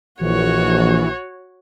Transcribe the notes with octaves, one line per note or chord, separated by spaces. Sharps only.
A#1 E3 F#4 C#5